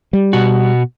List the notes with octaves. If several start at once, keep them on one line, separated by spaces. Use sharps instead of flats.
G3
B2 F#4